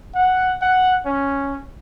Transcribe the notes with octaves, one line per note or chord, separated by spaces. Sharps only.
F#5
F#5
C#4